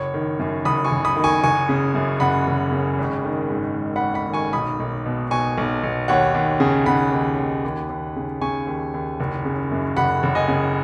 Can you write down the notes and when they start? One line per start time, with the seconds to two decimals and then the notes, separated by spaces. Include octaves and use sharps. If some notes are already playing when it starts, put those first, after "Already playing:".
Already playing: F#1 C#5
0.14 D#3
0.39 F#2
0.65 F#1 B5 D#6
0.85 G#5 C#6
0.91 F#1
1.05 B5 D#6
1.16 D#3
1.24 G#5 C#6
1.44 F#1 G#5 C#6
1.69 C#3
1.95 F#2
2.20 F#1 F#5 B5
2.47 F#1
2.72 C#3
2.98 G#1
3.25 D#3
3.50 G#2
3.76 G#1
3.96 F#5 B5
4.01 G#1
4.14 F#5 B5
4.27 D#3
4.33 G#5 C#6
4.53 B1 B5 D#6
4.80 B1
5.06 B2
5.31 B2 G#5 C#6
5.58 B1
5.83 B1
6.08 D#2 C#5 F#5
6.35 D#2
6.60 C#3
6.86 C#3 F#5 B5
7.12 D#2
7.38 D#2
7.65 D#2
7.89 D#2
8.16 C#3
8.41 C#3 G#5 C#6
8.67 D#2
8.94 D#2
9.20 F#1
9.45 C#3
9.72 F#2
9.96 F#1 F#5 B5
10.23 F#1
10.35 D#5 G#5
10.48 C#3